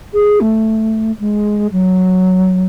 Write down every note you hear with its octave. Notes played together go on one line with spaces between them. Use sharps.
G#4
A3
G#3
F#3